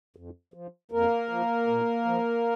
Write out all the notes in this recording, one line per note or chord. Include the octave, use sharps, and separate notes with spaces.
F2
F3
F2 A#3 A#4
F3
A#2
F3